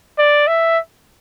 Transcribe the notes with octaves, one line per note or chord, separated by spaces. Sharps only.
D5
E5